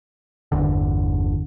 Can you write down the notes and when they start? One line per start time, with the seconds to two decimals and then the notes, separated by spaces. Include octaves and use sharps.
0.52 G1 E2 D3